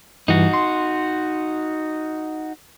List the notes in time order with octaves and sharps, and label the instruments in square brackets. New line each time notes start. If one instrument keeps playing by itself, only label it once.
[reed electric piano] G2 E3 G3 [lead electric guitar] D#4 F#4
[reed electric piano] C6